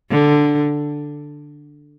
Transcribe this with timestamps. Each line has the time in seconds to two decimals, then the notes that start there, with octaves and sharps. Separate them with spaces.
0.11 D3